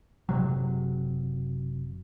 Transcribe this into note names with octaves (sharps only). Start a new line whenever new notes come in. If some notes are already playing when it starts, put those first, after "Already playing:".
F#1 C3 F#3